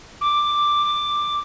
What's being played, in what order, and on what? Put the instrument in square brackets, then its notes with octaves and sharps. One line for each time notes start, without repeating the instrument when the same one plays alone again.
[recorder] D6